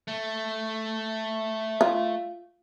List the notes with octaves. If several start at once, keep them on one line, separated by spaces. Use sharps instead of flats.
A3
F4